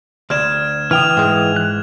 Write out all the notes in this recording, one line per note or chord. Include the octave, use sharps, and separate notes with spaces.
D2 D5 F6 G#6 E7
E3 G5 D#6 F6 F7
G#2 G#3
F#6